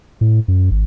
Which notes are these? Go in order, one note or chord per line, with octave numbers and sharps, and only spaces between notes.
A2
F#2
G#1